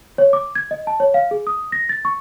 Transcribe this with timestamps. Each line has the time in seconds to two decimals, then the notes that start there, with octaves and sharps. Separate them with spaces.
0.18 C#5
0.33 D6
0.55 G#6
0.71 D#5
0.87 A5
1.00 C#5
1.14 F5
1.31 G#4
1.47 D#6
1.72 A#6
1.89 A6
2.05 C#6